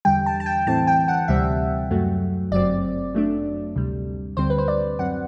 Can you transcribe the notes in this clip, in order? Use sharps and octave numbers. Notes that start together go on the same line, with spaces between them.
E2 D3 G3 G5
A5
A5
G5
A2 E3 A3 C4 A5
G5
F#5
D2 C3 G3 C4 E5
F#2 F#3 A3
G1 F#2 F#3 C4 D5
F#2 F#3 A3 D4
D2 C3 G3
D2 D3 G3 C4 C5
B4
C5
D5
F#2 F#3 C4 F#5